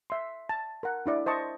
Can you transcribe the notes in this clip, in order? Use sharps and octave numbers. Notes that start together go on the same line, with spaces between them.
E5 C6
A5
A#4 F#5
D4 E4 D5
C5 D#5 A5 C#6